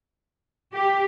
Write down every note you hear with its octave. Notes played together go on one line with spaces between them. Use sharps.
G4